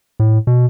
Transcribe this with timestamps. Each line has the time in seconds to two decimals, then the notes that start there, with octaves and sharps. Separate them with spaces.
0.20 A2
0.47 B2